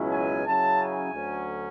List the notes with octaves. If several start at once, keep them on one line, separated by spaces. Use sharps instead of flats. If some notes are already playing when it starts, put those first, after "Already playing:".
Already playing: C#2 B2 F#3 C#4 E4
G#5
C#3 F#3 C#4 E4 A5
G#5
D2 D3 F#3 C#4